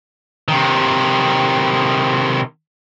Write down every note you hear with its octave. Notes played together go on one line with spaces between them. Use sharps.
C3 D#3